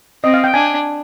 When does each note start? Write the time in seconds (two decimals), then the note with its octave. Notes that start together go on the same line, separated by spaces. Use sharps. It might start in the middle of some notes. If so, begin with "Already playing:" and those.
0.24 C4 D#5
0.34 F5
0.44 G5
0.54 D4 G#5